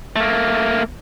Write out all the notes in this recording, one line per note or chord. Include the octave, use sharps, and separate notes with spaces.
A3 A#3